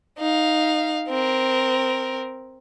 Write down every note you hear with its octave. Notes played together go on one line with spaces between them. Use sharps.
D#4 F5
C4 A#4